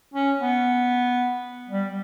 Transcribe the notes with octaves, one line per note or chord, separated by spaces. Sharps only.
C#4
B3
G3